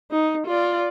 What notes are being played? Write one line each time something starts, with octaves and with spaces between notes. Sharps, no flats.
D#4
F4 D5